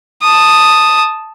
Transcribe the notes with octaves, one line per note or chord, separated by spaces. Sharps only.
A5 D#6